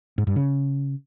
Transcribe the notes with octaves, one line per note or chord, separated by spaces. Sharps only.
G#2
G2
C#3